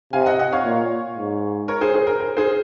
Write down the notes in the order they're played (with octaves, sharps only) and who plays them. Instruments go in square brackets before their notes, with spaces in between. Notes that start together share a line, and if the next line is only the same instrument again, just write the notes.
[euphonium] C3 [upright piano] F5 G#5
[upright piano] D#5 F#5
D#5 F#5
C#5 F5
[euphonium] A#2
G#2
[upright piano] A#4 C#5
G#4 C5
G#4 C5
A#4
A#4
G#4 C5